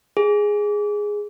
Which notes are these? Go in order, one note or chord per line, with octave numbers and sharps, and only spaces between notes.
G#4